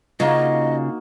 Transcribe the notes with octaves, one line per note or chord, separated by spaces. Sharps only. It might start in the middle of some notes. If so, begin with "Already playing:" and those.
C#3 A#3 D#4 F4 F#4 D#5